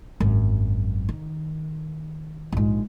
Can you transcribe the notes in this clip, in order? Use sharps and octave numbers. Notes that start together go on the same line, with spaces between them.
G#1 F#2
D#3
A#1 G#2